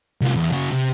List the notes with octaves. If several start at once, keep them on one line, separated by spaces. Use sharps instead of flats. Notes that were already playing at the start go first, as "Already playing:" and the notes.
C2 F4
E2
C#3 F#4
C3